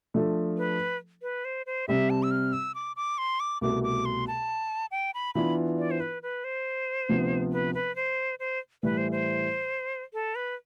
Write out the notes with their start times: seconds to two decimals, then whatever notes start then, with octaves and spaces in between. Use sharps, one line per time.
0.14 F3 A3 D4 F4 A4
0.58 B4
1.22 B4
1.45 C5
1.66 C5
1.88 C3 G3 C4 G4 E5
2.10 A5
2.23 E6
2.31 F6
2.53 E6
2.75 D6
2.96 D6
3.18 C6
3.40 D6
3.61 C2 B2 A3 D6
3.83 D6
4.05 C6
4.27 A5
4.91 G5
5.14 B5
5.35 E3 B3 D4 F4 B5
5.78 D5
5.91 C5
6.00 B4
6.23 B4
6.44 C5
7.09 D2 C3 F3 B3
7.52 B4
7.75 B4
7.96 C5
8.39 C5
8.83 A2 E3 G3 B4
8.98 C5
9.12 C5
10.13 A4
10.35 B4